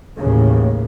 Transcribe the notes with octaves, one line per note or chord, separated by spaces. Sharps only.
A1 D#2 A2 C#3